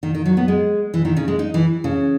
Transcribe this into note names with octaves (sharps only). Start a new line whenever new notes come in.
D#3
D#3
F#3
B3
G#3
E3
D#3
C#3
G#3
D#4
E3
C#3